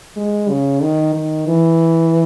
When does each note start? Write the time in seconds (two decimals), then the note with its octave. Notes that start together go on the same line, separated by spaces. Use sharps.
0.17 G#3
0.49 C#3
0.82 D#3
1.14 D#3
1.48 E3